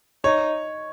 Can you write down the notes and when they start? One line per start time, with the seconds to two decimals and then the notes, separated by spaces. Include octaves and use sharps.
0.24 D#4 C#5